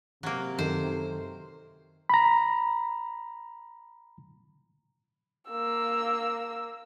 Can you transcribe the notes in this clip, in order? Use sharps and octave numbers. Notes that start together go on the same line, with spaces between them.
C3 F#3 A#3
F#2 D#3 A4 C5
A#5 B5
A#3 E6